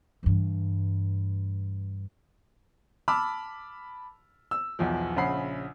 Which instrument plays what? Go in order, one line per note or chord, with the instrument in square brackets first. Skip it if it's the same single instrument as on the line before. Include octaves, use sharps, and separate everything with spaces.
[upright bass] G2 E3
[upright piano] A5 B5 D6 E6 F6
E6
B1 E2 F3
A#1 C#3 F#5 B5 C7